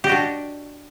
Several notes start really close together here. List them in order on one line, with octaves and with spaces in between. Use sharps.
G4 D#5 F#4 D4